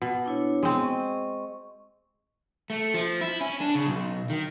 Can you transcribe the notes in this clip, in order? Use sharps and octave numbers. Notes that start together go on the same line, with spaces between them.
B2
D4 E4 C#5
G#3 B3 C4
D#5 C#6
A3
F3
E4
C#4
D4
C#3
B1
D#3